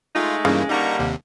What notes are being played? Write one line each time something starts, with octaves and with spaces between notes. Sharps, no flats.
G#3 A3 D#4 F4
G2 C#3 E3 A#3
D3 G3 A#3 D#4 A#5 C#6
D#2 C3